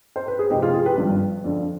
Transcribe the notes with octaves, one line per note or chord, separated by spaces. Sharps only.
C5
B4
G#4
F1 F2 C3 D#4 G4
F4 G#4
F4 G#4
G4 B4
G#1 G2 F3
F2 D3 F3